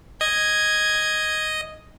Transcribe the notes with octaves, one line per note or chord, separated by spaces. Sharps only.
D#5 G#6